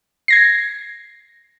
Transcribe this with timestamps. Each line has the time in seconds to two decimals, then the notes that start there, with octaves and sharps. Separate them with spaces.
0.28 G#6 A#6 C7